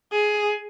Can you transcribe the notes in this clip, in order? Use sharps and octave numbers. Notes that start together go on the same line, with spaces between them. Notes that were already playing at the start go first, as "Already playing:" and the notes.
G#4